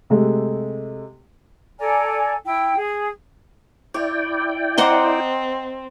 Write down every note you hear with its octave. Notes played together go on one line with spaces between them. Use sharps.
C3 G#3 A3
A4 D5 G#5 A#5
E4 G5
G#4
E4 C#5 D5 G5
C4 C5 D#5 F#5 A#5 D6